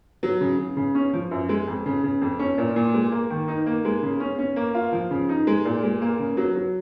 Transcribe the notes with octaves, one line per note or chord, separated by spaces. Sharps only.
F#3
C#3
C#3
C#3
C#4
F3
F#2
G#3
F2
C#3
C#3
F2
C#4
A#2
A#2
G#3
A#3
D#3
D#4
A#3
G#3
C#3
C#4
C#4
A#3
F4
F3
C#3
D#4
G#3
A#2
G#3
A#3
C#3
F#3
F#3